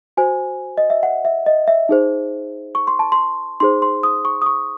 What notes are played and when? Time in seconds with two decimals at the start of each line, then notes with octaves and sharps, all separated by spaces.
0.17 F#4 C5 G#5
0.78 D#5
0.90 E5
1.03 F#5
1.25 E5
1.46 D#5
1.68 E5
1.89 D#4 G#4 C5
2.75 C#6
2.87 C6
2.99 A5
3.12 C6
3.60 D#4 G#4 C5 C6
3.82 C6
4.03 D#6
4.25 C#6
4.42 D#6
4.46 C#6